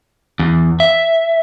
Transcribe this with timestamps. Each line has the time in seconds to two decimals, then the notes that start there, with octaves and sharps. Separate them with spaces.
0.39 E2
0.80 E5